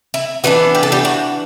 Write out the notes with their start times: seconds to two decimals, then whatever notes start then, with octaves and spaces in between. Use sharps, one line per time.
0.14 E4
0.44 E3 B3 D4 F#4
0.75 G4
0.83 A4
0.92 G3 G4
1.05 F#4